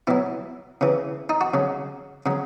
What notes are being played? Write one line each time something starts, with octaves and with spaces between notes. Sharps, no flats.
B2 F#3 E4
C#3 E3
D#4
F#4
C#3 F#3
C#3 F#3